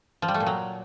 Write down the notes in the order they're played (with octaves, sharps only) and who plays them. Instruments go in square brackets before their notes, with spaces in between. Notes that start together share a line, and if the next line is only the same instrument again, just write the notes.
[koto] F3
G3
A3
A#2
F#3